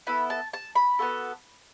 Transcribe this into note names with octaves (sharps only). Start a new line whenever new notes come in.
B3 E4 A4 B5
A5
A5
B5
B3 F#4 A4